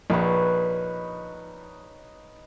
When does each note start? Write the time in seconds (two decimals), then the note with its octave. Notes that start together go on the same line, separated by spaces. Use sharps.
0.10 A#1 D#4 B4 C#5